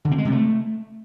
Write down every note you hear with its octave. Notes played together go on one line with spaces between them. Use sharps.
D3
C4
G#3
C3
A3